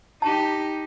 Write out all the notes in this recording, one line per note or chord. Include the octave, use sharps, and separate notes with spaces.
D#4 G4 A5